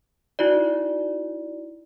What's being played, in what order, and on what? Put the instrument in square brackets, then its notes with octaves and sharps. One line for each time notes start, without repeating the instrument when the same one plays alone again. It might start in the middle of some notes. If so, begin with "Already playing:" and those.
[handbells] D#4 E4 F#4 D5